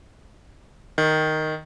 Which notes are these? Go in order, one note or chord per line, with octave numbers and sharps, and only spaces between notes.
D#3